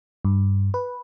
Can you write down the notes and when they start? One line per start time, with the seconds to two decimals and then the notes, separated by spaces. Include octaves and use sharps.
0.25 G2
0.74 B4